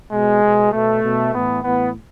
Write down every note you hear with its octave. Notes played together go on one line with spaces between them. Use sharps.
B2 G#3
B2
B2 A3
B2
A2 E3 B3
A2 E3 B3